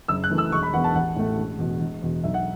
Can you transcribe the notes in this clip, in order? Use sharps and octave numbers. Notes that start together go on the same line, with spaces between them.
F#1 E6
F#6
F#2 E3 A3
E6
E1 C#6
B5
E2 E3 B3 F#5
A5
A1 F#5
A2 A3
E1
E2 B2
E1
E2 B2
B1 E5
F#5